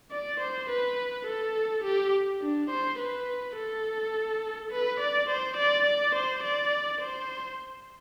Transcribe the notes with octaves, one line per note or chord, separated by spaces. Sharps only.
D5
C5
B4
A4
G4
D4
C5
B4
A4
B4
D5
C5
D5
D5
C5
D5
C5